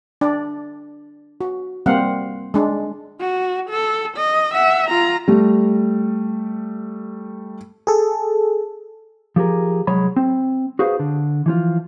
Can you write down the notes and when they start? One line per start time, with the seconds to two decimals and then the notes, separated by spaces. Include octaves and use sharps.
0.21 D4 D5
1.41 F#4
1.86 G3 A#3 C4 F5 F#5
2.54 G#3 D4
3.20 F#4
3.70 A4
4.17 D#5
4.54 E5 F#5
4.89 F4 A#5
5.28 G3 A3
7.87 G#4 A4
9.36 F3 G4 G#4 A#4
9.87 C2 F#3 G#3 C#5 B5
10.16 C4
10.79 F#4 G#4 B4 C5 F5
10.99 D3
11.46 E3 F3 F4